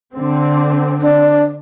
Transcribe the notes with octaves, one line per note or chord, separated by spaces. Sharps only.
D3 C4
D4